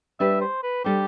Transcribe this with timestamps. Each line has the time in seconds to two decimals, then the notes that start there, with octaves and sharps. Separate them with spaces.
0.19 G3 D4 G4 B4 E5
0.41 C5
0.63 B4
0.84 G3 D4 G4 A4 C5